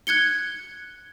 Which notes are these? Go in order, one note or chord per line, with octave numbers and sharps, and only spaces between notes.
F#6 G#6 C#7 G7